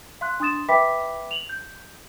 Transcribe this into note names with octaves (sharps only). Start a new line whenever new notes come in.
F5 C6 F#6
D4 C6 D#6 A6 E7
B4 E5 G5 B5 D6 B6
F7 F#7
G6